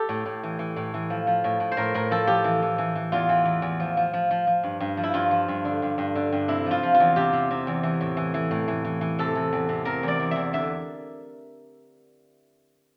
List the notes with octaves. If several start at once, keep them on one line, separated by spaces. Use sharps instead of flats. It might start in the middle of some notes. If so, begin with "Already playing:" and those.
Already playing: G4 A4
A2
A2
E3
E3
A2
E3
F3
F3
A2
A2
C5
A2 A#4
A2 A#4
F3 A4
F3 G4
E3
E3
E3
E3
E2 F4
E3
E2
E2
F3
F3
F3
F3
F3
G2
G2
F3
E4
G2 F4
F3
G2
D3
G2
G2
D3
G2
C3 E4
F3 F4
F3
F4
E2
C3 G4
C3
C3
E2
E3
A2
E3
E3
A2
E3
E3
E3
C3 A4
E3
E2
C3
C3 A#4
E2 D5
E2
E2 E5
D3 E5